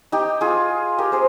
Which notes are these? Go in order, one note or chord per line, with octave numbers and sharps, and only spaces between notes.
D#4 G4
F4 G#4
G4 A#4
G#4 C5